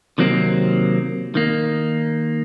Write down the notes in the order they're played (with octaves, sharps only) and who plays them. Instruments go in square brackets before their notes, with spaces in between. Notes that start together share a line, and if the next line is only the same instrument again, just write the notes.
[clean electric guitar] C3 D#3 F#3 A#3 C4
D#3 A#3